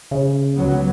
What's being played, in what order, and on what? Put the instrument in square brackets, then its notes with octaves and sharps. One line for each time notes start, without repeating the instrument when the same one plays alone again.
[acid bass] C#3
[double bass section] C#2 F#3 B3